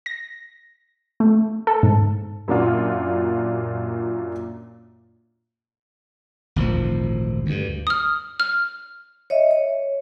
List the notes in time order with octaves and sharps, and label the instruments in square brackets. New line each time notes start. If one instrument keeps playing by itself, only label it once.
[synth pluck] A#6
A3
A4
G#2
[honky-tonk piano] F#2 A#2 D4 F4 F#4
[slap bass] G#1 D2 A#2 F3
D2 G2
[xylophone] D#6 F6
F6
[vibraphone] C#5 D#5 E5
C#5